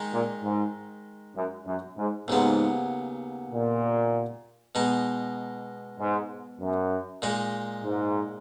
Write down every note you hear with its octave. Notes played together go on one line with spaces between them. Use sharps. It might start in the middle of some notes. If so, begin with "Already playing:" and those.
Already playing: D#3 G#3 D#4
A#2
G#2
F#2
F#2
G#2
D#2 G#2 C#3 F#3 B3
A#2
B2 G#3 D#4
G#2
F#2
A#2 G#3 D#4
G#2